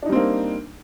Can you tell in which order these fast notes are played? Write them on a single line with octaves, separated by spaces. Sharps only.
D4 D#4 G3 C4 A#3